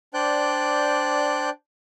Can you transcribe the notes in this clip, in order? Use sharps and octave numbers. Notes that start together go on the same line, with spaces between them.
D4 C5 D5 G5 F#6 G6